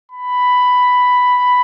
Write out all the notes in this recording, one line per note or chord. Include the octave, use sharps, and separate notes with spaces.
B5